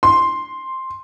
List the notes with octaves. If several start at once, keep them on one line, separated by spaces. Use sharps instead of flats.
C6